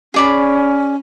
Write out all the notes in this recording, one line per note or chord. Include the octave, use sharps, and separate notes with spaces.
C#4 G#4 D5 B5